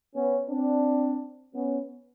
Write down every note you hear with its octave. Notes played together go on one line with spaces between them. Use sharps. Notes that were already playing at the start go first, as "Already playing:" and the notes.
B3 C#4
C4 D4
B3 C#4